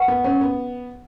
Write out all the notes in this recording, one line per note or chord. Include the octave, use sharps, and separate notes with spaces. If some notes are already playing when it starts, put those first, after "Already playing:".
Already playing: B4 F#5 C#6
B3
C#4
B3